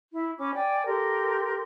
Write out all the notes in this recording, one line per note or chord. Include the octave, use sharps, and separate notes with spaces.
E4
C#4 B5 D6
D5 G5 G#5
G4 A4 A#4 C6